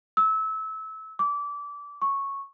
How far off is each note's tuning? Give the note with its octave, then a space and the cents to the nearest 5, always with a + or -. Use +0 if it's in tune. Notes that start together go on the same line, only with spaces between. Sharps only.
E6 -25
D6 -25
C#6 -10